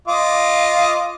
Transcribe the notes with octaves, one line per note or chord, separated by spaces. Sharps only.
F4 D#5 D6